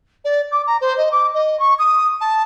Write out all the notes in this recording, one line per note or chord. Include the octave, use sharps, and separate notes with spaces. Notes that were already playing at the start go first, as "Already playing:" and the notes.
D5
D6
A#5
C5
D#5
D6
D#5
C#6
D#6
A5